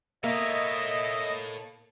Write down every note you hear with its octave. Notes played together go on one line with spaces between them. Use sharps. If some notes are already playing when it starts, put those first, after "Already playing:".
A#3 A4 C#5 D#5 E5